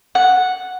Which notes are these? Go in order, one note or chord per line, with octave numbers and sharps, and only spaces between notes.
F#5